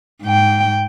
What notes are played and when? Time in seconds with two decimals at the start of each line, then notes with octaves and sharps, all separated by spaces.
0.22 G#2 G5